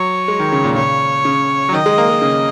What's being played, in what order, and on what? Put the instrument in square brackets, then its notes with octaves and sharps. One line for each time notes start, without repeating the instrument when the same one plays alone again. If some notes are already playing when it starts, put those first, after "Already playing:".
Already playing: [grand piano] F#3 [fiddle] C#5
[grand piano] G#3
D#3
C#3
A#2
[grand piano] C#3 [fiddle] C#5
[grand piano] C#3
F#3
[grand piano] D#3 [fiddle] D#5
[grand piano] G#3
A#3
G#3
C#3